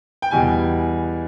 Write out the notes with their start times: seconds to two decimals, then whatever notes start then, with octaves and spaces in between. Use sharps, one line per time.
0.22 G5
0.31 E2 B2 G3 G#5